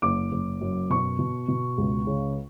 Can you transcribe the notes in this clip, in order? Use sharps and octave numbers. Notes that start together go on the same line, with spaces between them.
F#1 D6
F#1
F#2
B2 C#6
B2
B2
C#2
C#3